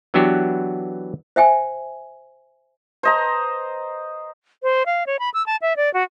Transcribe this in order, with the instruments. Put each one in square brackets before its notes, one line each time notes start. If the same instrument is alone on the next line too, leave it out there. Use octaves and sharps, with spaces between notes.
[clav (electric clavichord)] E3 F#3 B3 D4 F#4 G4
[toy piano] C5 E5 G5 G#5
[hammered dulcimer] C5 D#5 A#5
[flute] C5
F5
C#5
B5
E6
A5
E5
D5
F#4